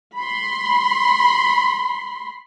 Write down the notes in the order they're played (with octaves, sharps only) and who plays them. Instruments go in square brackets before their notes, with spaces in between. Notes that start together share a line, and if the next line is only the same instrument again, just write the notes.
[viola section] B5 C6